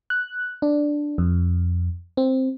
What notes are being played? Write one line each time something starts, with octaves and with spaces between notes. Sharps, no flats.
F#6
D4
F2
C4